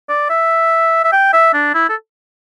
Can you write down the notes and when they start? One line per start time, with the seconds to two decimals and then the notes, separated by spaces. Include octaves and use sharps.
0.09 D5
0.30 E5
1.04 E5
1.12 G5
1.33 E5
1.53 D4
1.74 E4
1.89 A4